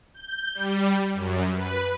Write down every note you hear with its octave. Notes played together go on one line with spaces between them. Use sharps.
G6
G3
F#2
B4